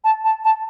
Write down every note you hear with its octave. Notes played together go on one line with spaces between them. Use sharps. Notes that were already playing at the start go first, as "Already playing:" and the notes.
A5
A5
A5